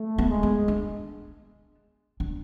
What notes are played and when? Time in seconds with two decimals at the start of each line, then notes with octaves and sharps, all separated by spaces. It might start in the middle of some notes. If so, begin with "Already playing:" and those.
Already playing: A3
0.18 B3
0.30 G#3
0.43 B3
0.68 D4
2.20 D4